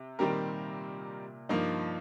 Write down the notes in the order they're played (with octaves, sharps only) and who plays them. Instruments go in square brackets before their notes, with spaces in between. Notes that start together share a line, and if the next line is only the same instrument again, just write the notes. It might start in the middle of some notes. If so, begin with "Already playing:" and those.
Already playing: [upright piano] C3
[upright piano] A#2 [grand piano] D#3 G3 C4 G4 A#4
[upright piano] G2 [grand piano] F3 A#3 D#4